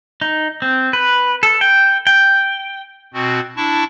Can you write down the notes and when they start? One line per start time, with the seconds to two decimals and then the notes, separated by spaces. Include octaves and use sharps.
0.21 D#4
0.62 C4
0.93 B4
1.43 A4
1.61 G5
2.07 G5
3.14 B2 C4 F#4
3.57 D4 E4 A5 C#6